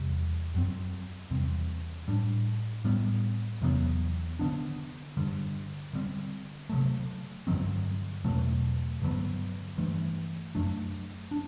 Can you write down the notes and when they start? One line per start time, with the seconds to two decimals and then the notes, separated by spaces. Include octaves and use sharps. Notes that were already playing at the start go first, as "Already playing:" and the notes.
Already playing: E2 C3 G3
0.54 F#2 F#3 C4
1.31 E2 C3 G3 C4
2.08 A2 G3 D4
2.85 A2 G3 B3
3.62 E2 C3 F#3 B3
4.39 D3 F#3 B3 D4
5.17 G2 D3 G3
5.93 D3 G3 C4
6.70 C3 F#3 A3
7.47 G2 D3 F#3 C4
8.25 E2 B2 F#3 A3
9.01 G2 D3 F#3 B3
9.78 G2 E3 A3
10.55 F#2 F#3 A3 D4
11.31 D4